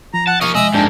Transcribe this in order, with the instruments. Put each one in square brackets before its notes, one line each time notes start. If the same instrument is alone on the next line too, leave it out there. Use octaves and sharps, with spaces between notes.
[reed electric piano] F3 [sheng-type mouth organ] A#5
[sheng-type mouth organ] F#5 [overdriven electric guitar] A5
[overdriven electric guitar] A#3 D#5 [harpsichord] F5 [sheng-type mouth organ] C#6
[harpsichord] G#3 E5 D6 [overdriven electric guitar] D#5 [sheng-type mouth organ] E6
[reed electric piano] F2 D4 A5 [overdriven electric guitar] G#2 A#3 [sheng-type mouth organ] G5